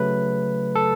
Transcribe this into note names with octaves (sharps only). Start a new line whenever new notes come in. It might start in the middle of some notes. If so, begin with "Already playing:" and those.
Already playing: C#3 F#3 A3 B4
A4